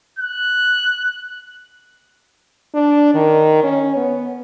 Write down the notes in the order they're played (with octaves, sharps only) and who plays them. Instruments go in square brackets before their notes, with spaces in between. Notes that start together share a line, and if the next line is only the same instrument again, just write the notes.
[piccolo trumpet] F#6
[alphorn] D4
D#3
C#4
B3